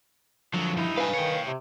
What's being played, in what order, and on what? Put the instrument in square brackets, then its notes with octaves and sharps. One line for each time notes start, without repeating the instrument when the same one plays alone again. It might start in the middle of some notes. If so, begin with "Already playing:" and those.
[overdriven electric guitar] D3 F3 [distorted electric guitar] F#3
[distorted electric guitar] G2 D#4 [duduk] E4
[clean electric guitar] B4 [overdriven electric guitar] F5 G#5
[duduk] D#3 [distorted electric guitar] C#5 G5
[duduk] C3